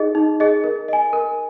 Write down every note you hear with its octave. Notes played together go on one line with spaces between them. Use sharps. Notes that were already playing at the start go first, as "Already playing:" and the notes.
Already playing: D#4 G#4 D#5
D#4
G#4 D#5
A#4
D#5 G#5
A#4